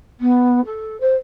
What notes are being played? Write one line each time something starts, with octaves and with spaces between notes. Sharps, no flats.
B3
A4
C5